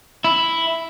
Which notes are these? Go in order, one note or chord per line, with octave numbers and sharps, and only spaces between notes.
E4